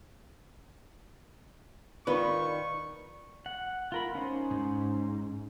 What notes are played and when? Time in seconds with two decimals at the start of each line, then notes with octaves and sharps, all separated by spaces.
2.07 D#3 D#4 F4 B4 D5 B5 C#6
3.46 F#5
3.92 F4 A#4 B5
4.15 C#4 D#4 C5
4.51 G#2